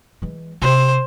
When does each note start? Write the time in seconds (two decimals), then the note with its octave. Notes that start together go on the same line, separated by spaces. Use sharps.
0.22 E3 G#3
0.62 C3 C5